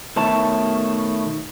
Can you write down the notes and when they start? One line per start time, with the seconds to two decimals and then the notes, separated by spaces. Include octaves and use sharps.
0.16 B2 D#3 A3 C#5 A5